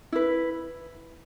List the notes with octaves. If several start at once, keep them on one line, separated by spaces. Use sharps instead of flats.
E4 B4